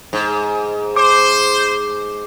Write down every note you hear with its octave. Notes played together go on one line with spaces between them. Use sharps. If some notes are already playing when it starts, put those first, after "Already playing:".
G#2
C5 D6